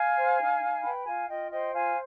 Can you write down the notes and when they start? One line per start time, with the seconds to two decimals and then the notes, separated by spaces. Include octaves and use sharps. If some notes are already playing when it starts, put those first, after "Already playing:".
Already playing: F5 G#5
0.16 C5
0.40 D#4
0.61 D#4
0.83 B4 G5 B5
1.05 F4 F5 G#5
1.27 F4 D#5 G5
1.50 C5 D#5 G5
1.72 F4 F5 G#5